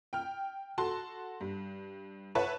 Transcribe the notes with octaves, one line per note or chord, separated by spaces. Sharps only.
G5 F6
F#4 A4 A5 C6
G2
B4 C#5 E5 F#5 A5 B5